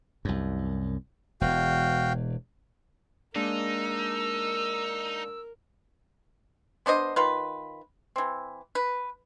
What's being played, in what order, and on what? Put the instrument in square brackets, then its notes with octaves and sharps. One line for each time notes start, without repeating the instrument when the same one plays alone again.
[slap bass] C2 F#2
[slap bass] E1 E2 [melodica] F#4 F5 G5
[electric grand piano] G#3 A#3 D4 [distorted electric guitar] D#4 [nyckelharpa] A#4 [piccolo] E6
[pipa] B3 D4 C5 D#5
D#3 F4 B4
E3 C4
B4